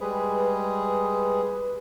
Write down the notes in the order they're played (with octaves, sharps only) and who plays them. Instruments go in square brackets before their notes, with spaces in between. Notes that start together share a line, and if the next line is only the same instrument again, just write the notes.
[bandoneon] G3 G#3 G#4 [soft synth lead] B4